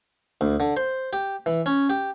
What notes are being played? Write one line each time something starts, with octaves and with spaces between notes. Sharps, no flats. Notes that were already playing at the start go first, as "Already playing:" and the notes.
D2
D3
C5
G4
E3
C#4
G4